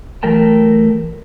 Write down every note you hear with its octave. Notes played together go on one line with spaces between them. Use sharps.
E3 F#3 A3 A#4 G5 A5